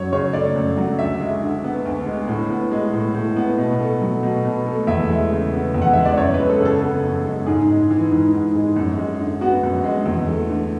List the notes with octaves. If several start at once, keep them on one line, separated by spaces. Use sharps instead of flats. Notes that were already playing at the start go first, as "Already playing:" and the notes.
Already playing: F#2 F#3 C#5
C#3 C#5
A3 D5
F#2
F#3
D2 E5
G#3
D3
B3
D2
G#3
A2
B3
G#3
A2
A2
B3
B2
A3
F#3
B2
B2
A3
E2 E5
G#3
C#3
B3
E2
F#5
G#3 E5
D5
F#2 C#5
G#3 B4
A4
C#3 A4
B3
F#2
G#3
G#2 G#4
G#3
E3
G#2
G#2
G#3
F#2
G#3
D3
B3 F#4
F#2
G#3
E2
A3
D3